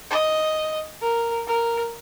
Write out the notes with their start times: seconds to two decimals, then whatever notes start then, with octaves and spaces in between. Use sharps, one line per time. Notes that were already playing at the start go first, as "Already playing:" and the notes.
0.10 D#5
1.01 A#4
1.47 A#4